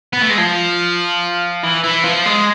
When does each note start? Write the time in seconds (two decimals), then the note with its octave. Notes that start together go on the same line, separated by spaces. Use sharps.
0.13 B3
0.21 A3
0.29 G#3
0.38 F3
1.63 E3
1.84 E3
2.05 F3
2.26 G#3